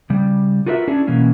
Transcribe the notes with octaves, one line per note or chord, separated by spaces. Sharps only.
C#3 G3
F4 F#4 A#4 B4 C#5 E5
C#4 D4 E4 G#4
B2 E3 A#3 C#4